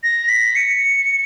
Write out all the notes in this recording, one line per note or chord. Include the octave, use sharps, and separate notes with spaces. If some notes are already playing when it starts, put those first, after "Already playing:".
A#6
B6
C#7